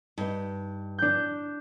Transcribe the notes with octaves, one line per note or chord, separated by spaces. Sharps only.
G2 D#4
D4 G6